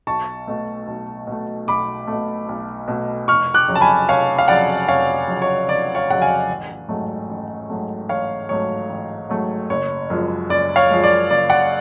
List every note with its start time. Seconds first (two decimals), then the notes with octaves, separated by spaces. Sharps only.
0.07 B1 A5 C#6
0.48 B2 A3
0.88 B1
1.27 B2 A3
1.67 B1 B5 D6
2.07 B2 A3
2.49 B1
2.88 B2 A3
3.28 F1 C#6 F6
3.54 D6 F#6
3.68 F2 C#3 F#3
3.75 A5
3.81 G#5 B5
4.09 F1 C#5 F5
4.39 F5
4.48 F2 C#3 F#3 D5 F#5
4.88 F1 C#5 F5
5.28 F2 C#3 F#3
5.42 C#5
5.68 F1 D5
5.95 C#5 F5
6.09 F2 C#3 F#3 F#5
6.22 F5 G#5
6.49 A1
6.88 G#2 F#3 A3
7.29 A1
7.69 G#2 F#3 A3
8.09 A1 C#5 F5
8.49 G#2 F#3 A3 C#5
8.89 A1
9.29 G#2 F#3 A3
9.70 F#1 C#5
10.10 F#2 F3 G#3
10.49 F#1 D5
10.76 C#5 F5
10.90 F#2 F3 G#3
11.04 D5
11.30 F#1 D5
11.50 D5 F#5